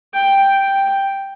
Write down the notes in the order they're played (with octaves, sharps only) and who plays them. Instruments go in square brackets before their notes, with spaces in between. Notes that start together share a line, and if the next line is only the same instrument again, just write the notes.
[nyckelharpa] G5
G5